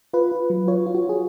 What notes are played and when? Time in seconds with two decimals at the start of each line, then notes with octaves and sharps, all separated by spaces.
0.14 F4 B4
0.32 F4
0.50 F#3
0.68 F4 C#5
0.86 F4
0.95 F#4
1.04 F4 G#4